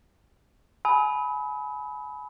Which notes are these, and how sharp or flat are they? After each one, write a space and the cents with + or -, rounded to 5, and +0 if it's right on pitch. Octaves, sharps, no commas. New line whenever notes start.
G#5 +30 B5 +0 D#6 +45